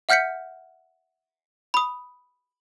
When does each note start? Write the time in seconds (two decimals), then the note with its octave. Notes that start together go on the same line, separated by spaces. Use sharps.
0.09 E5 F#5 F6 G6 B6 C#7
1.74 B5 D#6